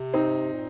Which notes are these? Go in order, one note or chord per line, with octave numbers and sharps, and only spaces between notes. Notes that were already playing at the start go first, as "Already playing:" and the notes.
Already playing: C3
C4 D#4
A#2